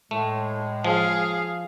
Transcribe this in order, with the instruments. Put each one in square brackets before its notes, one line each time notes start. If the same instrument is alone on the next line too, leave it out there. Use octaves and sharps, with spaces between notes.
[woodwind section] A2 G#3 [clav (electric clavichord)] A3
[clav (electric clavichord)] F3 [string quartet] G#4 F5